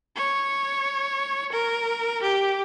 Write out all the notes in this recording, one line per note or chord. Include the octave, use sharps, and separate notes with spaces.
C#5
A#4
G4